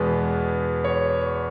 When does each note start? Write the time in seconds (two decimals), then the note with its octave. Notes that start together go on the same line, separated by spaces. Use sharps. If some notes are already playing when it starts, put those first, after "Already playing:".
Already playing: E2 B2 G#3 B3
0.85 C#5